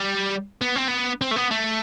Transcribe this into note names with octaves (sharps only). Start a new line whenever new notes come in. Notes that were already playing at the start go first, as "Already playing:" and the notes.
Already playing: G3
B3
C4
B3
C4
A3
B3
A3